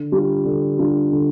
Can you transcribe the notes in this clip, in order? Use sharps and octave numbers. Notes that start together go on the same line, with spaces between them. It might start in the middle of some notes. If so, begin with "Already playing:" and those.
Already playing: D3
G3 D4 F4
D3
G3 D4 F4
D3